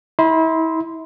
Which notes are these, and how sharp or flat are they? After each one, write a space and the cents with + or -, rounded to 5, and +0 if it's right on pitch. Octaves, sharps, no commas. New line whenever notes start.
E4 -35 C6 -15